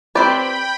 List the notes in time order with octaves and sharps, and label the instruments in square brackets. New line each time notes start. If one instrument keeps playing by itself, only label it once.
[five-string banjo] C4 G4 B4 D5 [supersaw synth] G5 B5